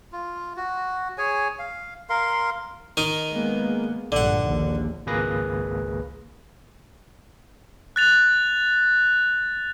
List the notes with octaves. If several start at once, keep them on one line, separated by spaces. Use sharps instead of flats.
F4
F#4
G#4 C#5 G#5
F5
A#4 F5 C6
D#3 D#4 A#4
G#3 A#3 B3
A#1 G2 D3 F#5
A#1 D#2
G#1 C#2 A#3 G#4 B4 A#6
F#6 A6 F7